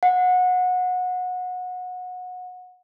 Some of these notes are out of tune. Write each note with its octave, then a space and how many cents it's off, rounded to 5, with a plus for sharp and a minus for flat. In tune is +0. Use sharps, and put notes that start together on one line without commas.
F#5 -25